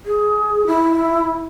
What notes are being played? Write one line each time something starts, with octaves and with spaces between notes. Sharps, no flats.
G#4
E4